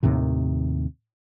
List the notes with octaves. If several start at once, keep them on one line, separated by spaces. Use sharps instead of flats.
D#2 A2 C3 D#3